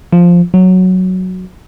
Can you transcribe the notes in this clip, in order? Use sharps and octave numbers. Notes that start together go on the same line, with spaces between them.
F3
F#3